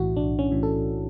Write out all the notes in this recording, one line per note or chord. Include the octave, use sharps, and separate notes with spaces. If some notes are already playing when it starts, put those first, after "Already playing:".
Already playing: B1 A2 E3 E4 F#4
B1 D4
C#4
A2 E3
A4